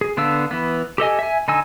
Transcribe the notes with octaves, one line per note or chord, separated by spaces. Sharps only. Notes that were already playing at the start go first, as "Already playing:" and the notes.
G#4
D3 B3 D4 F5 E6
E3 B3
G4 A4 D#5 G#5
E5 G#5
D3 D#4 G#5 E6